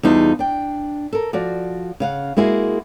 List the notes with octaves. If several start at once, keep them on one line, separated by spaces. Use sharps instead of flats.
E2 G3 D#4 F4 G#4 A5
D4 G5
A4 A#4
F3 F#4 D5
C#3 F5 F#5
G#3 A#3 E4 F#4 G#4